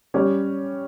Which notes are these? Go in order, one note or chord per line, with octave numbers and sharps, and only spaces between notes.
G3 C#4 G4